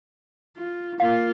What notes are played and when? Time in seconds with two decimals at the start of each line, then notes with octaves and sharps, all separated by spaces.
0.57 F4
1.00 A#3 F4 F5